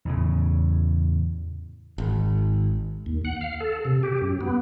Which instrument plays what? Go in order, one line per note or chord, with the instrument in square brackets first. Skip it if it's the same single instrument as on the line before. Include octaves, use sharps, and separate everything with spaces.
[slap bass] E2 A2 C#3
[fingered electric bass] G#1
[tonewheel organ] D#2
F#5
F5
A4
C3
G4
F#2
B3